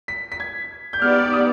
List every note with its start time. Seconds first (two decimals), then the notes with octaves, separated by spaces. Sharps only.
0.08 B6
0.32 B6
0.40 G#6
0.93 G6
1.02 B3 D#4 G4 D5 F6
1.23 D6
1.33 D#6